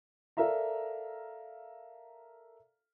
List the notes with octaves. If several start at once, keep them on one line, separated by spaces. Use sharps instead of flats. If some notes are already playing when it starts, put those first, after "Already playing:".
A4 A#4 D5 E5 F5 A#5